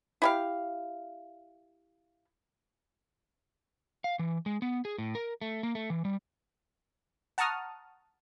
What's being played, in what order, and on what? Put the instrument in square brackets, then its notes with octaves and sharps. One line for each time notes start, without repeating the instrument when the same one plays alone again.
[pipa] E4 G4 F5
[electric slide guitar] F5
E3
G#3
B3
G#4
A2
A#4
A3
A#3
A3
E3
G3
[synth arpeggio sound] F#5 A5 A#5 C#6 D#6 F6